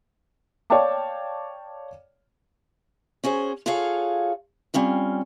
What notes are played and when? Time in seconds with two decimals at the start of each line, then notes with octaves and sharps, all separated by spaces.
0.70 C#5 D5 F5 G5 A5 D6
3.24 C#4 F#4 G#4 C5
3.66 F4 F#4 G#4 A4 C#5 F5
4.74 G3 C4 C#4 F4